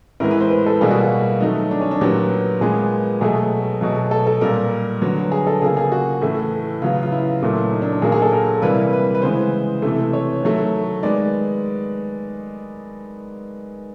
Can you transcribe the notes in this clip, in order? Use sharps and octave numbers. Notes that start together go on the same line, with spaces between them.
A2 E3 G#3 B3 A#4
B4
C5
B4
A4
B2 G3 A#3 G#4
F#4
F4
D#3 F#3 A3 D#4
D4
C#4
D4
A#2 F#3 B3 G4
A#2 F3 G#3 B3 G#4
B2 F#3 A3 G#4
B2 F#3 A3
A4
A4
A#2 G3 A#3 A#4
D3 F#3 B3
G#4
A4
C#3 F3 A#3 G#4
G#4
F#4
A2 E3 A3
C#3 F#3 B3 F4
F4
E4
A#2 F#3 A3
D#4
D4
D4
A#2 F#3 A#3 G#4
G#4
A4
A#4
C3 E3 G3 A#3 B4
B4
B4
C#3 E3 G#3 B3 C5
C3 E3 A3
C#5
D#3 F#3 A3
D#3 G#3 B3 D5